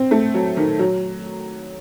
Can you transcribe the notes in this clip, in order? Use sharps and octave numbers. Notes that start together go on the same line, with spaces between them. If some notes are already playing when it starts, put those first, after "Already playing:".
Already playing: C4
A3
F#3
D#3
F#3